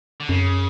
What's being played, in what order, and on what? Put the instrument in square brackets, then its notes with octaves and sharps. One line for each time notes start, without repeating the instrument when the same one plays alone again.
[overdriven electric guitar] D3
[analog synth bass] F#2 [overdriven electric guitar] C#3